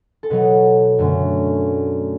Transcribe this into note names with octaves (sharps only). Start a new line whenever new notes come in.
A4
B2 F#3 B3 B4
F#2 D3 A3